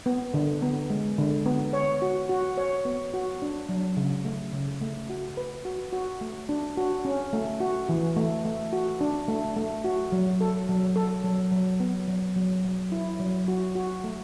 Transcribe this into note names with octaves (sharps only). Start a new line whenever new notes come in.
B3
D3
B3
G#3
D3
B3
C#5
F#4
F#4
C#5
B3
F#4
D4
F#3
C#3
A3
C#3
A3
F#4
B4
F#4
F#4
A3
D4
F#4
C#4
A3
F#4
E3
A3
A3
F#4
D4
A3
A3
F#4
F#3
A4
F#3
A4
F#3
F#3
B3
F#3
F#3
F#3
E4
F#3
F#4
F#4
A3